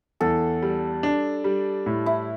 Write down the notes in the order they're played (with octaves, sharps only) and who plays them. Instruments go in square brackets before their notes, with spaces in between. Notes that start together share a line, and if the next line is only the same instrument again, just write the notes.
[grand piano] E2 [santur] A4
[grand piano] G3
D4
G3
A2
[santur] E4